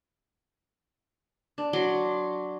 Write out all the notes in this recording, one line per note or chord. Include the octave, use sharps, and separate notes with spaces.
D4
F#3 C6 D6